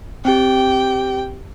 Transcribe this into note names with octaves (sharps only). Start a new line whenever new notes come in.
C4 G4 G5